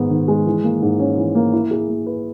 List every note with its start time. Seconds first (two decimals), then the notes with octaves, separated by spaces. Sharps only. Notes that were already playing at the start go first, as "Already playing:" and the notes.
Already playing: G#2 D#3 G#3 B3
0.10 D#3
0.28 G#3
0.46 E3
0.64 A#3
0.82 G#2
1.00 C#4
1.17 E3
1.35 A#3
1.53 E4
1.71 G#4
1.88 A#3
2.06 B4